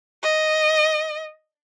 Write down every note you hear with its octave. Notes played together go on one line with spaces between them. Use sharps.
D#5